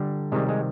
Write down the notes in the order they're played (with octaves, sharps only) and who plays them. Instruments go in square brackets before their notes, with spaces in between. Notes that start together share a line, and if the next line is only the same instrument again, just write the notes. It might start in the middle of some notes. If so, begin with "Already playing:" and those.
Already playing: [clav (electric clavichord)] D3 G3
C3 D#3 G3 G#3
G#3